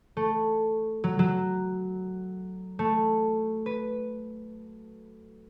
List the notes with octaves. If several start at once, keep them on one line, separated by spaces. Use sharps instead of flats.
A3
F#3
F#3
A3
B4